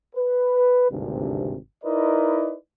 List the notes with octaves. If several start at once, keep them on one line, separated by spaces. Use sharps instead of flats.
B4
G#1 D2 G2 C3
D#4 E4 A#4 B4 D5 D#5